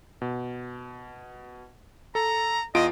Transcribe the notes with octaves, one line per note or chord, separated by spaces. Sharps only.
B2
A4 A#5
E2 F4 D#5 D7